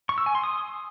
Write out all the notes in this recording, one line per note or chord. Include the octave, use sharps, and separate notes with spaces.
C#6
E6
G#5
C6
D#6